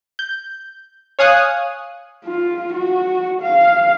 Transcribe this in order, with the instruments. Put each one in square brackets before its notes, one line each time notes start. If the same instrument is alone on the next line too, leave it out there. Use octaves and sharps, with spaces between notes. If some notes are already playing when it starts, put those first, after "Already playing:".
[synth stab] G6
C#5 F5 G#5 D#6 F#6
[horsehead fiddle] F4
F#4
F5